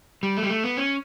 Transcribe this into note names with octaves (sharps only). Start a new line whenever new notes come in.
G3
A3
G3
A3
B3
C#4